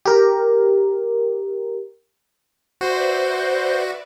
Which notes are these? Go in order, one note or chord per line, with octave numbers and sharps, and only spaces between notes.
G4 A#4
F#4 B4 C5 D5 E5